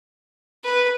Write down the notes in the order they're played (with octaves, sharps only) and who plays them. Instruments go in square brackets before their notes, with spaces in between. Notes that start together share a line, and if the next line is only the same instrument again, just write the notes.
[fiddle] B4